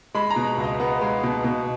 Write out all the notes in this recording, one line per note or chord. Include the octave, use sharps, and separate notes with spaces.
G#3 B5
A#5
B2
C#2
D#5
B3
G#3
B2
B2